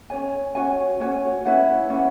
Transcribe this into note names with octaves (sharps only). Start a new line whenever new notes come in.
C#4 F#4 C#5 G#5
C#4 F#4 C#5 G#5
C#4 F#4 C#5 G#5
C#4 E4 B4 F#5
C#4 E4 B4 F#5